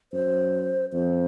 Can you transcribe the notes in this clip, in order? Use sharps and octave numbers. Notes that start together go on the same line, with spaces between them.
F#2 C5
F2 C5